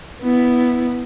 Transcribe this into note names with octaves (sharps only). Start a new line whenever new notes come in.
B3 E4